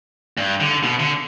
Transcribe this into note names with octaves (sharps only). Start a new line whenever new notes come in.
G2
D3
B2
D3